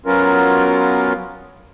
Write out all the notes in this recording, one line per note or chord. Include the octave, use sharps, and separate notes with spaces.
F#3 B3 C#4 F4 A#4